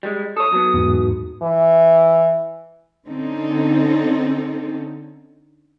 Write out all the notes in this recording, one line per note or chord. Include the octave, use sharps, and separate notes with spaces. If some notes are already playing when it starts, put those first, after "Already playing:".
G3 G#3
A4 C#5 D#6
F#3 B3
E2 G#2
E3
D3 C4 C#4 D#4 A4